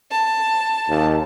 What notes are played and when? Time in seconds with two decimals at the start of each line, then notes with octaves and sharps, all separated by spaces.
0.11 A5
0.89 D#2